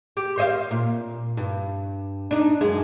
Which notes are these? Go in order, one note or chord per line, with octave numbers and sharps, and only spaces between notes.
G4
C5 D#5 F5
A#2
G2
D4 D#4
F#2 G#3